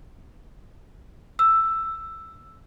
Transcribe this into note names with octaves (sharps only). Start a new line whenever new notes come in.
E6